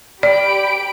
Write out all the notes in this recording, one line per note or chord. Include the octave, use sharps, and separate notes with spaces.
G4 D5 B5 D7